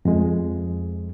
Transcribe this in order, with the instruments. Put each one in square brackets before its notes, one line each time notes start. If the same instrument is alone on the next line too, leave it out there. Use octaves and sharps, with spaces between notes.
[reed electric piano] F2 G#3